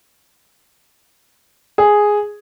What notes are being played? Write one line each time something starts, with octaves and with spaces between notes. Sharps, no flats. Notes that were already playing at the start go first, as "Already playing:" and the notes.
G#4